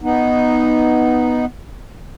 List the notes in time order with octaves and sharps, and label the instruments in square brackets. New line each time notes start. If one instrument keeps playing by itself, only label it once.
[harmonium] B3 D#4